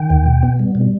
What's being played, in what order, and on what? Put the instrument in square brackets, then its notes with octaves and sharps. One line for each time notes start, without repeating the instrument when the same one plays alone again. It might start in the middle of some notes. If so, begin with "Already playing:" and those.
Already playing: [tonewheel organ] D#3 G5
D#2
B2
B3
G3
B2